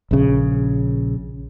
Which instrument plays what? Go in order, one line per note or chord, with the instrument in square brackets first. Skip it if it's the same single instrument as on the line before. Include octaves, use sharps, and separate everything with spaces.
[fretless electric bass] A#1 C#3